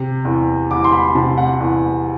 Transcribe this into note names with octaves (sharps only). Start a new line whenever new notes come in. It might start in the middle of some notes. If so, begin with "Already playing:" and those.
Already playing: C3
E2
E2 D6
C6
B5
C3 A5
F#5
E2